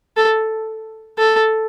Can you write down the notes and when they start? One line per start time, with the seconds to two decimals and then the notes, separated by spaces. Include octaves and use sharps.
0.17 A4
1.18 A4